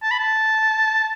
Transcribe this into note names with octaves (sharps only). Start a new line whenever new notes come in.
A5
B5
A5